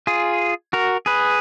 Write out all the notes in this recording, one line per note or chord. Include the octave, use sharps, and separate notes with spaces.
F4 G#4
F#4 A#4
G#4 B4